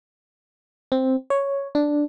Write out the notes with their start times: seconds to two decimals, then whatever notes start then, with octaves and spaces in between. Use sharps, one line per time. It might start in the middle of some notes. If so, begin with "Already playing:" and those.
0.92 C4
1.30 C#5
1.75 D4